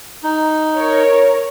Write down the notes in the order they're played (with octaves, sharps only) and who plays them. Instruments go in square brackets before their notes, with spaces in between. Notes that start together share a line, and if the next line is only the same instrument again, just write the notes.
[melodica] D#4
[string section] A#4 C#5